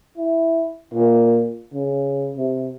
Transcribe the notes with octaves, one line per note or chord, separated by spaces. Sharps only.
E4
A#2
C#3
C3